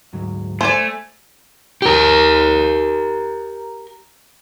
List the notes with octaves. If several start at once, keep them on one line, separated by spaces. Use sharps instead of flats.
D2 G#2 F#3
A3 C5 D5 G#5
G4 A#4